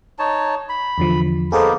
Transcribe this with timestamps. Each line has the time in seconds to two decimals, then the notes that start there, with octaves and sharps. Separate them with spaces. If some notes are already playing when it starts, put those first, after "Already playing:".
0.19 D#4 C#5 A5
0.69 B5
0.98 E2 D3 F3
1.52 A#3 B3 D#4 G#4 A4 C5